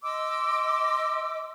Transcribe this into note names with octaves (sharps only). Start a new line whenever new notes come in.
D#5 C6 D6 E6